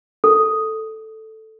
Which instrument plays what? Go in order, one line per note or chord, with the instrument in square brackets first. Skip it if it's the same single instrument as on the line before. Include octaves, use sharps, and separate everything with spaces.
[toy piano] A4